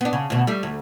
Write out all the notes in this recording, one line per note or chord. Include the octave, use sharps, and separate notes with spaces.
B3 D4
C#3
D2 B2
G3 A3
D2